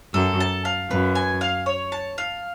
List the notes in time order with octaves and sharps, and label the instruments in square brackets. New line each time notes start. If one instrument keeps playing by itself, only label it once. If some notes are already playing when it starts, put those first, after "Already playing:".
[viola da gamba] F#2 [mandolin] A4
[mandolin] A5
F5
[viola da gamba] F#2 [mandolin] B4
[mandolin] G#5
F5
C#5
A5
F5